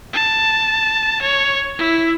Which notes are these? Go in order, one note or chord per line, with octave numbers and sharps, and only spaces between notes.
A5
C#5
E4